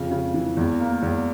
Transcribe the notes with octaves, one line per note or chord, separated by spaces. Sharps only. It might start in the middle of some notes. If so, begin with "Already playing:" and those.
Already playing: F2 C#3
C#3
E3
E2
A#3
E2